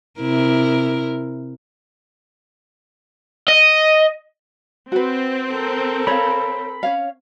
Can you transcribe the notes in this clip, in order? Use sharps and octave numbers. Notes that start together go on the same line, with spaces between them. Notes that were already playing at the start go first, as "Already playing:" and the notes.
C3 E4 A#4
D#5
C4 F#4 B4
A4 A#4
C#5 F5 B5
C#4 C#5 F5